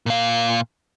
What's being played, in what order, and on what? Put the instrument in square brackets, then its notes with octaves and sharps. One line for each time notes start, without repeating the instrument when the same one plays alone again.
[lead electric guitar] A#2 F5